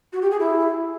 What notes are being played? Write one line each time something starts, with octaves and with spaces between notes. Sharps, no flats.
F#4
G4
G#4
E4